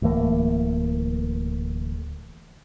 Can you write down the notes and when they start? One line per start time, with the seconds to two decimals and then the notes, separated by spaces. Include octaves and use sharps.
0.02 D1 E3 A3 A#3